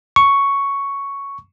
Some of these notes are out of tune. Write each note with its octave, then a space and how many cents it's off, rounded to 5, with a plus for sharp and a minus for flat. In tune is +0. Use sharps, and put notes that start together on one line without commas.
C#6 +5